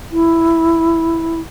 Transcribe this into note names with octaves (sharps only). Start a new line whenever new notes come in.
E4